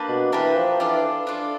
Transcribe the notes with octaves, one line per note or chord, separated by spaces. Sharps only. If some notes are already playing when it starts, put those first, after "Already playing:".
Already playing: A#3 D4 G4 B4
B2
E3 A#3 D4 G4 B4
F3
E3 D4 F4 A4 D5
D4 F4 A4 D5